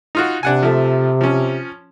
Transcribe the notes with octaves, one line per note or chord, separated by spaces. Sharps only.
D#4 F4 F#4
C3 D4 F#5 G#5
F3 A3
F3 C#4